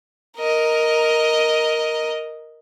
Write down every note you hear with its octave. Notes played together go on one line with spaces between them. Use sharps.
A#4 D#5